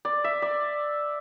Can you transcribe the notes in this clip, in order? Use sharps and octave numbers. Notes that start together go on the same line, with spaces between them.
D5
E5
D5